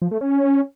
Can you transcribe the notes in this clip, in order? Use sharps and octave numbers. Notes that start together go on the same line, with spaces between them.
F3
A3
C#4